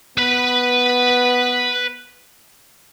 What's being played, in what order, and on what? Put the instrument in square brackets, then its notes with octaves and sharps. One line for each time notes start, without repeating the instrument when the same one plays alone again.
[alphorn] B3 [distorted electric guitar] B4 B5